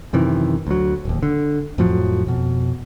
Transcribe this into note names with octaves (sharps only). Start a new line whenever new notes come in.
F#2 C3 D#3 E3
D2 F#3
D1 D#2
D3
F2 A2 F3 F#3
F2 B2